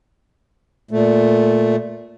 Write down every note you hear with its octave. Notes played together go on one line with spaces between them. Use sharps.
A#2 A3